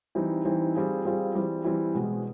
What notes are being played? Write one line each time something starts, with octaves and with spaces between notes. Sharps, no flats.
E3 G3 C4 D#4
E3 G3 C4 D#4
G3 C4 F4 G#4
G3 C4 F4 G#4
E3 G3 C4
E3 G3 C4
B2 G#3 C4